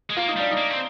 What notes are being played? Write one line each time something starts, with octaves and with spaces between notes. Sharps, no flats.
G#3
A#3 F4
D#4
G3 D4
D#4
A#3
C4